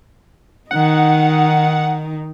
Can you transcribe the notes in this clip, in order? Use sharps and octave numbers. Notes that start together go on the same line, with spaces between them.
D#3 D#4 F#5